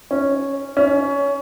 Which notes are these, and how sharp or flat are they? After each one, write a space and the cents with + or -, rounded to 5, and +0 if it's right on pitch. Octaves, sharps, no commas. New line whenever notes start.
C#4 -5
C#4 +20